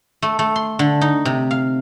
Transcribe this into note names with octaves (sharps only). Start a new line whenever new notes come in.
A3
A3
C6
D3
D#4
C3
F5